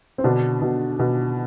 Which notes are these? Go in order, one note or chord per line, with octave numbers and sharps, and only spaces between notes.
C4
B2 D3 D4
B2
B2